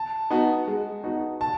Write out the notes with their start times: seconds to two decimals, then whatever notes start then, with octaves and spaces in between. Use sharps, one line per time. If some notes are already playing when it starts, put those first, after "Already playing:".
Already playing: A5
0.30 B3 D#4 F#4
0.68 G#3
1.04 B3 D#4 F#4
1.41 A5